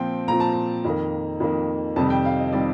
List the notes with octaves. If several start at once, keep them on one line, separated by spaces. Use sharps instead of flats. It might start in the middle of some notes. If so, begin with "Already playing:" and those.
Already playing: A#2 F3 C4 G5
A#2 F3 C4 A#5
A5
A#5
F2 D#3 A#3
F2 D#3 A#3
F2 C3 D#3 G3 A5
G5
F5
D#5
C3 D#3 G3 D5